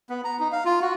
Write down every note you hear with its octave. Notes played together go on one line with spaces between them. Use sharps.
B3
A#5
D#4
F5
F4
F#4